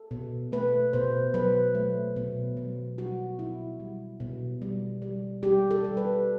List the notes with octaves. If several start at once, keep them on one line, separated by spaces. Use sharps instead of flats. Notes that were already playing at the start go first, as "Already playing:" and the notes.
Already playing: A4
B2
A3 B4
B2 C5
F#3 B4
A3
B2
F#3
G3 F#4
B2 E4
G3
B2
G3
G3
G3 G4
A4
G3
B4